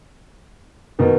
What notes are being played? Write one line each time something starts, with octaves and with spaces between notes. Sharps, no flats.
B2 D#3